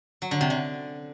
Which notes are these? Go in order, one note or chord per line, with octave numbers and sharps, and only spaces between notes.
F#3
D3
C3
D3